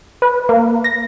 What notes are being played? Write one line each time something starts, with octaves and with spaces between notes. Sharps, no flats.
B4
A#3
A#6